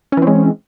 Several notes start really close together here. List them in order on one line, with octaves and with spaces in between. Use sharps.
C#4 E3 C4 G#3